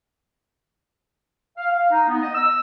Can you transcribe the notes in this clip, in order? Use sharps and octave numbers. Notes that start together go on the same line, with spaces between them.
F5
F5
D#4
B3
D#5
E6